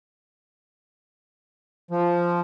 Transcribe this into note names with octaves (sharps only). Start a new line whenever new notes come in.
F3